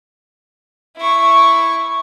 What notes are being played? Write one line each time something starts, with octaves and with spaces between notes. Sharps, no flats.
E4 C#6